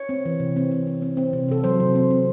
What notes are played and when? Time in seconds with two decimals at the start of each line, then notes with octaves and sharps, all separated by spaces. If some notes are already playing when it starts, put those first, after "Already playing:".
Already playing: C#5
0.09 C4
0.25 E3
0.40 C3
0.56 C4
0.71 C4
0.87 C4
1.02 C4
1.17 C4
1.33 C3
1.48 C3 A4
1.64 F#3 C5
1.80 C3
1.95 C4
2.11 C4